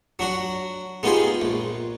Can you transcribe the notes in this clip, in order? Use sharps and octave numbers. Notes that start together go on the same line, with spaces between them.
F#3 D4 F#4
G#3 B3 D#4 F4 G4 G#4
A#1